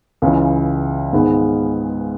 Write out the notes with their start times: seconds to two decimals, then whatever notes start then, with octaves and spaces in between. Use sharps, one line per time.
0.22 C#2 C#3 E3
1.13 G#2 D#3 G#3 B3